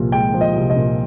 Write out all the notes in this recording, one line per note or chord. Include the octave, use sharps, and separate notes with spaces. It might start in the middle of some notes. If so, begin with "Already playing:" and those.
Already playing: C2 A#2 F3
G#3 G5
F3
D#5
C2
D#5
A#2